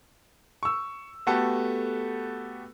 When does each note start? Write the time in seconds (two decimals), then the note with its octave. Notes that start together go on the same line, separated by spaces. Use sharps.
0.63 C#6 E6
1.27 A3 B3 F#4 G4 A4